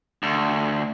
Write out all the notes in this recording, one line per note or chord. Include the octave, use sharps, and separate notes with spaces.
D2